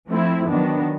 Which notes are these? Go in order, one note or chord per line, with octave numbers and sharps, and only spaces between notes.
F3 A3 C4 E4
D#3 F#3 B3 D4